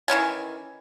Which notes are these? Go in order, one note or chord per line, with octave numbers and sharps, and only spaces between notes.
D#3 E3 C#4 G#5